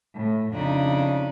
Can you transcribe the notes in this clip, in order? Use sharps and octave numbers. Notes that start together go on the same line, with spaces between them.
A2
F2 C#3 D4 D#4 B5